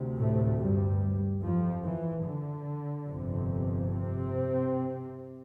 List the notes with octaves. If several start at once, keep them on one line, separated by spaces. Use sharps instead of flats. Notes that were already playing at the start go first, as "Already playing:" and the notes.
Already playing: D2 C3
A2 A3
G2 G3
F2 F3
E3
D3
G1 F2 C3
C3 C4